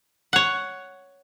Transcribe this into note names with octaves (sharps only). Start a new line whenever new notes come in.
C#5 F#5